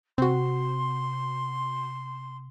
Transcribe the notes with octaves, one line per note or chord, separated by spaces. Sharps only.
C3 C4 F#4 C6